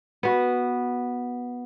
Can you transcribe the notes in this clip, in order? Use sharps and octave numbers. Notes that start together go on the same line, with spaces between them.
B3 F#4